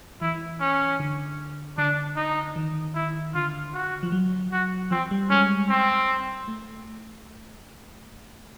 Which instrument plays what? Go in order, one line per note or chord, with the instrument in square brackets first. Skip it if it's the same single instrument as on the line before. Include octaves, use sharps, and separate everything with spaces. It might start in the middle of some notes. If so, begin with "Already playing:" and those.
[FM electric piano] E3 [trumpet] E4
[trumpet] C#4
[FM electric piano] D3
[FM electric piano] D3 [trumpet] D4
[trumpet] D#4
[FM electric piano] D#3
[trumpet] E4
[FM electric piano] D3 [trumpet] F4
[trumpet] F#4
[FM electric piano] F3
F#3
[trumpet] F#4
[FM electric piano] F3 [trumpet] C4
[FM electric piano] G3
[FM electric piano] G#3 [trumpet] C#4
[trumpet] C4
[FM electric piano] A3